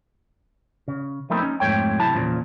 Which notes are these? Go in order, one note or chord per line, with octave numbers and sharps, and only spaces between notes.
C#3
F3 A3 A#3 C4 D#4 E4
C#4 D#4
F2 G#2 A3 C#5 G5
C3 F#3 E4 A5
E2 A#2 C#3 F3